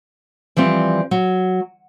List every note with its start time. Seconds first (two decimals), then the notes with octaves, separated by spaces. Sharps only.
0.57 E3 F3 G3 C4
1.11 F#3